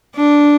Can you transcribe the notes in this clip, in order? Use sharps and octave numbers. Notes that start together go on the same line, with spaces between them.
D4